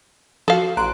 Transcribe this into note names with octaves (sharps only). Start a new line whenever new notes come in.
F3 F#4 A4 F5
A1 A#5 C6 F#6 D7